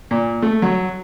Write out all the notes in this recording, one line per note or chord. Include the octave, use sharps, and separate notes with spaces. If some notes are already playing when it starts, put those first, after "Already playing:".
A#2
A3
F#3